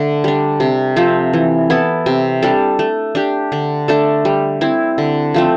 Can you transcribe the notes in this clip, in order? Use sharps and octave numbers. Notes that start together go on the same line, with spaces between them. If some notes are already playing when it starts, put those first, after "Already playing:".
Already playing: D3 A3
G3 D4
C3
F3 A3 C4
E3
B3 E4 A4
C3
G3 D4 A4
A3
D4 G4
D3
A3 D4 A4
G3
C4 E4
D3
F3 A3 C4